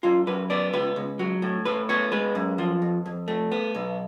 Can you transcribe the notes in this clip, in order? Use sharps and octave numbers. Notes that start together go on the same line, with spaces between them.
F#2 F4
F#2 B4
B3 D5
C#2 B4
C#2
F#3
A2
A2 B4
B3 C#5
G#3 B4
F#2
F3
F2
F2
A3
B3
B1